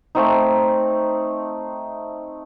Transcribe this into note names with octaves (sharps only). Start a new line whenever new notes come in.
A3 C4 D#4